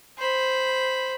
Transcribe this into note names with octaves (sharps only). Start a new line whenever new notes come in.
C5 B5